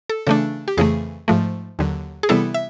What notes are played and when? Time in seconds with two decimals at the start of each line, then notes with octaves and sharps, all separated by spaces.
0.10 A4
0.27 C#3 E3 A3 D4 A4
0.68 G4
0.77 F2 C#3 E3 A3 G#4
1.28 G#2 F3 A3
1.79 D#2 D3 F#3
2.23 G#4
2.29 C3 E3 G3 B3 E4 A4
2.54 E5